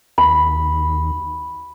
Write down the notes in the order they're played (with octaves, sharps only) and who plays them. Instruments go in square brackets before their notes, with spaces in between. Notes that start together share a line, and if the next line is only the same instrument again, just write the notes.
[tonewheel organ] D#2 [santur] B5